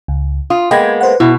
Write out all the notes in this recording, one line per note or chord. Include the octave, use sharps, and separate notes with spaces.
C#2
F4 D#6
G#3 A#3 B3 G5 B5 G#6
B4 C5 F#5
B2 E4